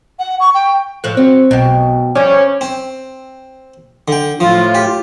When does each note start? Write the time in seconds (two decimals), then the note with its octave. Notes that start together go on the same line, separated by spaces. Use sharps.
0.19 F#5
0.39 C#6
0.54 G5
1.04 A2 F3 F#6
1.17 F#3 C4
1.51 B1 B2 G4
2.15 F3 G3 C#4 D6 G6
2.61 C4
4.08 D3 G5
4.40 A2 F3 F4
4.75 G4